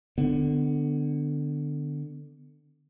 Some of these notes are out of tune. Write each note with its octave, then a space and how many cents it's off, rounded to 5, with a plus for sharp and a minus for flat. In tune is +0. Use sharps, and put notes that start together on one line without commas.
D3 +15 B3 +30